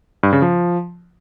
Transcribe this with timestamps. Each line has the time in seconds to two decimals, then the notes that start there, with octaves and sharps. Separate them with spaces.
0.23 G2
0.33 C#3
0.42 F3